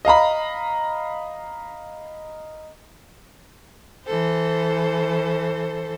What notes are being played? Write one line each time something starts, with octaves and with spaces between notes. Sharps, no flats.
D#5 F5 A#5 B5
E3 A4 C5